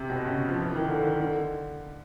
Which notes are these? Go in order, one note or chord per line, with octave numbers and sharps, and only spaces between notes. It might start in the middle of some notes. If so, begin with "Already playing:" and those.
Already playing: C3
B2
C#3
F3
E3
D#3
D3
D#3
D3